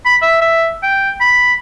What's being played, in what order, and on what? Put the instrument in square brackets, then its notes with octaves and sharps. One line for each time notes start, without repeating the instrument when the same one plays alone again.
[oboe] B5
E5
E5
G5
B5